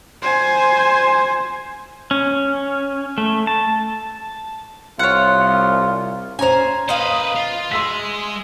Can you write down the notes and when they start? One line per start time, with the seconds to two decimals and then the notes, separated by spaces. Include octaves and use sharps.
0.22 C5 G#5
2.11 C#4
3.18 A3
3.47 A5
4.99 C2 F4 C#5 F#5
6.39 C#4 C5 G#5 A#5 F7
6.89 B4 C5 D#5 F5
7.36 F4
7.72 G#3 C6 E6 B6